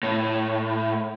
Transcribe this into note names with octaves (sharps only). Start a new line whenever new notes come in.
A2